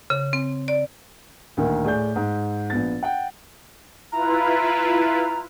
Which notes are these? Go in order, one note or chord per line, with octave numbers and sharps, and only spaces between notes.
C#3
C4
D5
D2 A#2 D#3 A#4
A2 G#4 D5 G6
G#2
A#1 B3 A6
F#5 G5
E4 F4 B4 A#5